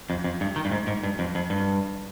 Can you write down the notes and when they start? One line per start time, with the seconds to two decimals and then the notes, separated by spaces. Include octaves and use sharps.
0.10 F2
0.24 F2
0.41 G2
0.56 D#3
0.65 G2
0.72 G#2
0.87 G#2
1.03 G2
1.19 F2
1.35 F2
1.50 G2